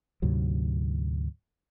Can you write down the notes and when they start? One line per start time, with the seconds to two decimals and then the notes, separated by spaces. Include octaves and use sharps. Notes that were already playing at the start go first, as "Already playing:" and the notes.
0.22 D2 G#2 C3 F#3